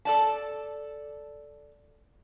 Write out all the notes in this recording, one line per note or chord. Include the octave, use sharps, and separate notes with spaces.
A4 D5 A5